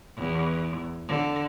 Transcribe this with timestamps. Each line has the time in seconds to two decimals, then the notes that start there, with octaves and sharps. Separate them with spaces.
0.17 E2
1.08 D3